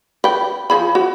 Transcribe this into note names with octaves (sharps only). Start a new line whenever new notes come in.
B4 G5
F3 G#4 B5
F#4